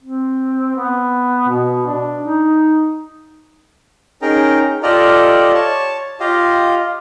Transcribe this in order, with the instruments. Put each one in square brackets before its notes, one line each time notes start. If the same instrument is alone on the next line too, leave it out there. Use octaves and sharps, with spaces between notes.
[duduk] C4
B3
B2
D4
D#4
[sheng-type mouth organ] C#4 D#4 G#4 A#4 G5 A#5
F4 G4 A4 D5 D#5 F6
C#5 A5
F4 G4 D#5 F5